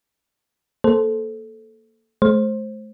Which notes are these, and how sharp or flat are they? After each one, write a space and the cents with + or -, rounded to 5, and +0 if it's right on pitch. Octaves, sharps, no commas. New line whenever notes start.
A#3 -10 A4 -10 C5 +0
A3 -40 C5 +20